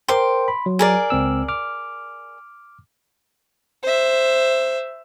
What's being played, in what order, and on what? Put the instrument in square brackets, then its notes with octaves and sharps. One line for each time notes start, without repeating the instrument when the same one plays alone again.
[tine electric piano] A#4 C5 G5 [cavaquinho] C6 D6
[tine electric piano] B5
F#3
[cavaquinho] G#4 A#4 D5
[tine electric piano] C#2 C4 E6
D6 F6
[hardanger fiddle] C5 E5